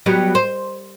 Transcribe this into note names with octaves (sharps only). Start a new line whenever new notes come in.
F#3 G3 B3
C5